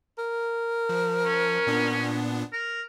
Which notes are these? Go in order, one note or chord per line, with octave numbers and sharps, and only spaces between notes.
A#4
F3
C#4
A#2 B3 D4
A#4